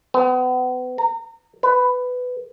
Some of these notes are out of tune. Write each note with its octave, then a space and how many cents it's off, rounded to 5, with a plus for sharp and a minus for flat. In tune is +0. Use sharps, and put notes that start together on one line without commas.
B3 +35
A#5 -30
B4 +15